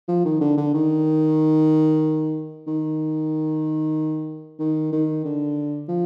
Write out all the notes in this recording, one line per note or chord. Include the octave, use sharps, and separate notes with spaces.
F3
D#3
D3
D3
D#3
D#3
D#3
D#3
D3
F3